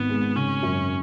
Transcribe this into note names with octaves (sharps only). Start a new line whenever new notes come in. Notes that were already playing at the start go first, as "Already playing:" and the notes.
Already playing: G#1 B3
G#3
C#3 C#4
F#2